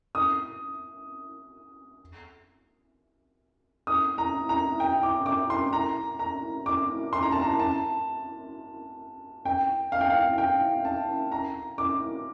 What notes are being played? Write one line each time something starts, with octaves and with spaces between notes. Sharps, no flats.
D#6
D#6
A#5
A#5
G5
D6
D6
C6
A#5
A#5
D6
C6
A#5
A5
A#5
A5
G5
F5
G5
F5
G5
A5
A#5
D6